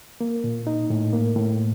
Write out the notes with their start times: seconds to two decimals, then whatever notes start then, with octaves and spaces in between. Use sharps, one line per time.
0.21 A#3
0.44 A#2
0.67 D#4
0.90 A2
1.13 A#3
1.36 A2